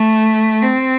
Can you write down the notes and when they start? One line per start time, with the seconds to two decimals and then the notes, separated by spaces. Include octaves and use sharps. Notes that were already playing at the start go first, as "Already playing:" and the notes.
Already playing: A3
0.62 C4